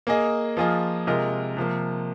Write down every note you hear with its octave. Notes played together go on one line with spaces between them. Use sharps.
A#3 G#4 D#5
F3 A#3 F4 G#4 D#5
C3 G#3 F4 A#4 D#5
C3 F3 A#3